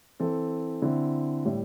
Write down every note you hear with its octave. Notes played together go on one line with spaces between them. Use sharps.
E3 C4 A4
D3 C4 E4
A2 G3 E4